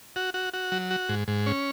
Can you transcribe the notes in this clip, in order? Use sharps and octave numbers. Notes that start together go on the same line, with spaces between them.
F#4
F#4
F#4
F#3
F#4
G#2
G#2
C#4